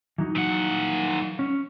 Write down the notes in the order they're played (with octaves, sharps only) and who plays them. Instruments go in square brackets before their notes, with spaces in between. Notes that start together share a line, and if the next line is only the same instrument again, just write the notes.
[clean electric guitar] E3 F#3 D#4
[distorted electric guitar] A#2 F#5
[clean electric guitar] C#4